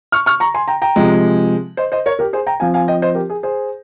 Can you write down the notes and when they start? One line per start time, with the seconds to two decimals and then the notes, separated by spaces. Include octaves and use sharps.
0.12 C#6 F6
0.26 C#6 F6
0.40 A#5 C#6
0.54 G#5 C6
0.68 G5 A#5
0.82 G5 A#5
0.96 C3 F3 G#3
1.77 C5 D#5
1.92 C5 D#5
2.06 A#4 C#5
2.19 G4 A#4
2.33 G#4 C5
2.47 G5 A#5
2.60 F3 C4 F5 G#5
2.74 F5 G#5
2.88 D#5 G5
3.02 C5 D#5
3.15 G4 A#4
3.30 G#4
3.43 G#4 C5